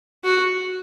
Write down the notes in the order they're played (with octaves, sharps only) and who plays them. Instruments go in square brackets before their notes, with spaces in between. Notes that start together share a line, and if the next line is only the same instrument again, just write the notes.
[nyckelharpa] F#4